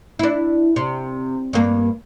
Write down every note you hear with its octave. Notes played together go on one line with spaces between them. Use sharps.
D4 E4
C3
G2 A#3